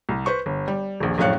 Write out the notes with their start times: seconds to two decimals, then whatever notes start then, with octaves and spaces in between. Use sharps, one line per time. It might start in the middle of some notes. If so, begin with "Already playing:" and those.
0.09 C2
0.26 B4 C5 C#6
0.46 G1
0.68 G3
1.00 D#1 A#1
1.18 A#1 F#2 A2 F5 F#6 C#7